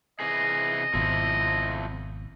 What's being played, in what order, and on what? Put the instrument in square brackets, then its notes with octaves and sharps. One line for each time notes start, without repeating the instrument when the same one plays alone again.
[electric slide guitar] C3 E3 G#4 [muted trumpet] D#5
[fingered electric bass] G#1 B2 [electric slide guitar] F3 C4 E4